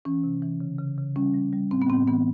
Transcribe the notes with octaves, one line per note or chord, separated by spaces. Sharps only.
E3 C#4
C3
E3
C#3
C#3
C#3
G3 C#4
G3
G3
A2 C4
B3
A2 C4
E3 B3